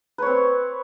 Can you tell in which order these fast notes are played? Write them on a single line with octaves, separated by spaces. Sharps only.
B4 C#5 C4